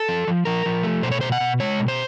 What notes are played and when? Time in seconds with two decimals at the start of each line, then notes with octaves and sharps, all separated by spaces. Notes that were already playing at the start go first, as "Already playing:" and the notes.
Already playing: A4
0.08 F3
0.27 F3
0.45 F3 A#4
0.66 F3
0.83 A3
1.03 B2 C5
1.12 C#5
1.21 B2 C5
1.32 F#5
1.40 B2
1.60 G#3 C#5
1.80 B2
1.88 C5